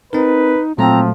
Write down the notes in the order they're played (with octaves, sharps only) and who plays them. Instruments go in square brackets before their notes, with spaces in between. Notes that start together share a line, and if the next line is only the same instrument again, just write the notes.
[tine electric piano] C4 A#4 [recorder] D#4 [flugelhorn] B4
[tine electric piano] A#2 F#3 A3 [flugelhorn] F3 [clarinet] C4 [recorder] A#5